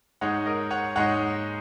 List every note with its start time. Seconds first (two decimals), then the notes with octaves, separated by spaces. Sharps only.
0.21 G#2 G#3 D#4 C#5 F#5
0.46 A#4 D#5
0.71 C#5 F#5
0.96 G#2 G#3 D#4 C#5 F#5